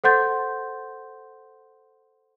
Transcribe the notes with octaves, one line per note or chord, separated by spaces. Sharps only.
A4 C5 F#5 C6 G6 A6